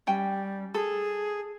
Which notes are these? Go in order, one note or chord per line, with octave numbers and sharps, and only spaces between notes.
G3 C#4 G5
G#4 A4